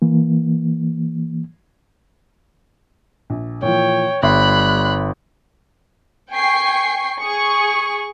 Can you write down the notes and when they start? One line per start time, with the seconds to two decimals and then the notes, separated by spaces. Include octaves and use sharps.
0.02 E3 A#3
3.30 A#1
3.63 A#2 E3 F3 C#5 G5
4.23 G1 G3 C#5 E5 B5 C6 F#6
6.33 G5 G#5 C#6 C7
7.21 G#4 C#6